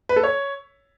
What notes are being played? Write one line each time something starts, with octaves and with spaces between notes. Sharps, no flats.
B4
A4
C#5